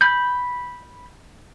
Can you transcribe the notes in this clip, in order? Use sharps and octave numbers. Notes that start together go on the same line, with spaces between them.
B5 G6